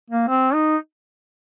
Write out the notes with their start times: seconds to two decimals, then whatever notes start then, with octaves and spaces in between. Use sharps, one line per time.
0.10 A#3
0.28 C4
0.54 D#4